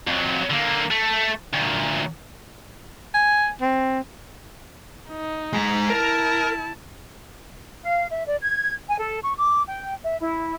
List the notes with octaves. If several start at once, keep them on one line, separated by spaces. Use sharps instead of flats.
F2 F#3
D3 A#3
A3
D2 A#2
G#5
C4
D#4
G#3 A#5
E4 A#4 A5
F5
E5
D5
G#6
G#5
A4
C#6
D6
G5
E5
E4